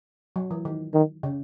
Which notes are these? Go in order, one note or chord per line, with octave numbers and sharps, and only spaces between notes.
F#3
E3
D#3
D#3
C#3